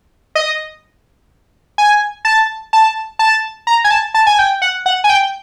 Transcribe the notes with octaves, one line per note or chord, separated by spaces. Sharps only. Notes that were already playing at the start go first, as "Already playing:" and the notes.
D#5
G#5
A5
A5
A5
A#5
G#5
A5
A5
G#5
G5
F#5
F#5
G#5
G5